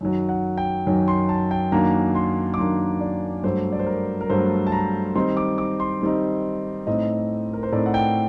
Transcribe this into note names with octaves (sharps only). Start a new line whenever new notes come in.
F#2 D#3 F#3
F#5
G5
F#2 D#3 F#3
C6
A5
G5
F#2 D#3 F#3 A#3 D4 A#5
C6
D6
F#2 D#3 F#3 A#3 D4 C6
D5
G2 F#3 A3 C5
D5
C5
A#4
A#4
G2 F#3 A3 C5
A5
A#5
D#3 G3 C4 D#4 C6
D6
D6
C6
D#3 G3 C4 D#4
A2 A3 C4 D#4 D#5
A#4
C5
A2 A3 C4 D#4 D5
F#5
G5